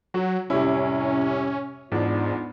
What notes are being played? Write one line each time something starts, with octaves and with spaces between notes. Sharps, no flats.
F#3 F#4
F2 A2 C3 G3 C#4 E4
E2 G#2 B3 D4 D#4 F4